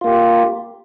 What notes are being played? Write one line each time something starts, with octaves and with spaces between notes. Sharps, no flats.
A#3 F4 G4